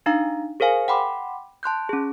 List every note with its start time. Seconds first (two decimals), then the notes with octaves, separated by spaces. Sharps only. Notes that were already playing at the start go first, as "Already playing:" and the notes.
0.06 D4 D#4 F5 A#5
0.60 G#4 A#4 C5 F5 G#5
0.88 F#5 G5 B5 C6 D6
1.63 A5 C6 F#6 G6
1.89 C#4 G#4